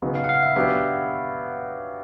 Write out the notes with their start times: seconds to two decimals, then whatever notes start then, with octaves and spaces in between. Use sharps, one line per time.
0.02 C#3 F#3 B3 D#4
0.15 F5
0.24 F#5
0.29 F5
0.43 E5
0.56 F#3 B3 D4 G4 E5